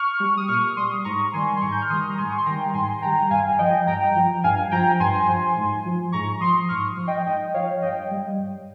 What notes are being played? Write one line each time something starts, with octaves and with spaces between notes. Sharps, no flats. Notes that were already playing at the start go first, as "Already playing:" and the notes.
Already playing: C#6 F6
G3
D#6
A#2 C#6 F6
G3 C6 D#6
G#2 A#5 C#6
D#3 G3 G#5 C6
C6
G#2 A#5 C#6
G6
F6
D#3 G3 C6 D#6
A#5
G#2 G#5 C6
C#6
C6
D#3 G3 G5 A#5
G#2 G#5 C6
D#3 G3 G5 A#5
G2 F5 G#5
F3 D#5 G5
G2 G5 A#5
F3
G2 F5 G#5
F3 G5 A#5
G2 G#5 C6
F3
G#2
F3
G#2 A#5 C#6
F3 C6 D#6
G#2 C#6 F6
F3
D#5 G5
G#2 D#5 G5
F3 C#5 F5
G2 D#5 G5
G3
G2